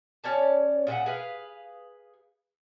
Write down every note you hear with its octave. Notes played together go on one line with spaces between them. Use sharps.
C#4 C#5 D5 A5
A#2 G#3 E5 F#5
G#4 B4 F5